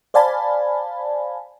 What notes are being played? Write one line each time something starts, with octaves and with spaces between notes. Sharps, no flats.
C5 D5 F5 G#5 A5 B5